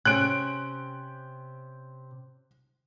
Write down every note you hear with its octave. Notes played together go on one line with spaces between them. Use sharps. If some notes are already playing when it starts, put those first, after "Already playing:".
C3 C#4 F#6 D7